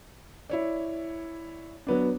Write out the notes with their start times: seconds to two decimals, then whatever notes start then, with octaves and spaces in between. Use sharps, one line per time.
0.50 E4 C#5 D5
1.87 F#3 B3 D4